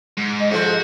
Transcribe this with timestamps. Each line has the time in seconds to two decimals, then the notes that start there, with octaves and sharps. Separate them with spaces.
0.17 G#2
0.40 D#5
0.51 G#2 F3 F#4 A4